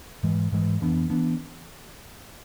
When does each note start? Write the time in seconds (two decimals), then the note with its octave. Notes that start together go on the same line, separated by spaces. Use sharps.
0.23 G#2 E3 G#3
0.52 G#2 E3 G#3
0.81 F2 E3 B3 D4
1.10 E3 B3 D4